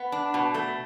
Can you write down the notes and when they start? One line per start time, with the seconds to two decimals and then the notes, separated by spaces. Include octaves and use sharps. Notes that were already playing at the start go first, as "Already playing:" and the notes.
Already playing: B3
0.12 D4
0.34 B2
0.54 A3